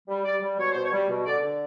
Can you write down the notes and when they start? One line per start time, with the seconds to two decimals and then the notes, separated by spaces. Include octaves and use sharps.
0.08 G3
0.24 G3 D5
0.41 G3
0.58 B2 C#5
0.71 B2 C5
0.84 C#5
0.92 G3
1.08 B2
1.25 D3 D5
1.42 D3